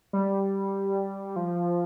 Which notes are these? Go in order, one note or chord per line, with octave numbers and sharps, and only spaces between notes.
G3
F3